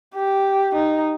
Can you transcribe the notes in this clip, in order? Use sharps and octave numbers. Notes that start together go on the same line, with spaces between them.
G4
D#4